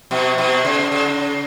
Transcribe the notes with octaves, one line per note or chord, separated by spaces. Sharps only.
B2
B2
C#3
C#3